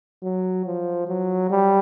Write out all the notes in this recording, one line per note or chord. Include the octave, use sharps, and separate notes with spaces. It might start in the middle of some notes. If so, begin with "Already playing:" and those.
F#3
F3
F#3
G3